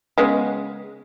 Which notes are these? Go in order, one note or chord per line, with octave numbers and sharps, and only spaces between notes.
C#3 G#3 B3